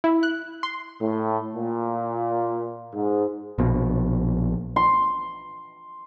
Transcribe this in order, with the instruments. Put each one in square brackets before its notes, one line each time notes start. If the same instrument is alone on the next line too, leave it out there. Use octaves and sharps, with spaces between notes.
[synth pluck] E4
F#6
C6
[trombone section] A2
A#2
G#2
[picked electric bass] A#1 B2
[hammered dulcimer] C6